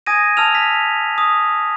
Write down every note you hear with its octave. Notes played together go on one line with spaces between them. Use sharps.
G#5 D#6 G#6 A#6 D#7
A5 E6 F6 F7
B6
D#6